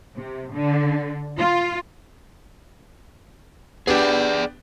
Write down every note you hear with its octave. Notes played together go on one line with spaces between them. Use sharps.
C3
D3
F4
B3 D4 G4 G#4 D5